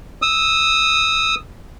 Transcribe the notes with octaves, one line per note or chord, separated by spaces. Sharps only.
D#6 E6